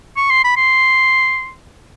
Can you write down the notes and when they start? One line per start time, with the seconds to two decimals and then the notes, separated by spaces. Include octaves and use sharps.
0.17 C#6
0.30 C6
0.44 B5
0.57 C6